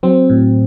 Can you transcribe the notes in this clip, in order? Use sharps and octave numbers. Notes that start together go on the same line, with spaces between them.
F#3 C4
A2